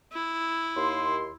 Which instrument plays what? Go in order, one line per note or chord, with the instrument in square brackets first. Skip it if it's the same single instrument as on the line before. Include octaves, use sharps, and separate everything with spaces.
[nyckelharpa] E4
[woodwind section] D#2 C6